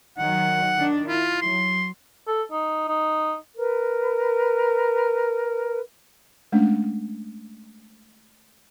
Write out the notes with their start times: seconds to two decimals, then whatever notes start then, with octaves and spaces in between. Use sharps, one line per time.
0.18 D#3 F#3 F#5
0.75 D#3 D4
1.08 E4 F4
1.42 F#3 C6
2.27 A4
2.51 D#4
2.88 D#4
3.57 A#4 B4
6.52 G#3 A3 C#4 D4